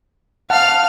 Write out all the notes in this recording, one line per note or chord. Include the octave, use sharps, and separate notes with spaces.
F5 F#5 A5 F6